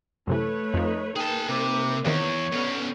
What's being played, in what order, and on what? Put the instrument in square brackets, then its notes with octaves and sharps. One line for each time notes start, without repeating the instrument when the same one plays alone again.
[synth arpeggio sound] F#2 C3 E3 [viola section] A3 B4 C#5
[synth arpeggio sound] F2 F3 [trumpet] D#4
[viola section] A#3 D#4 B4 [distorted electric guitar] G#4 A5 [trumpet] G5
[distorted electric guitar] C3 [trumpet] D6
[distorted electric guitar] E2 [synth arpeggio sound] C3 D#3 [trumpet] C#5
[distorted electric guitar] B2 C#4 [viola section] D3 B3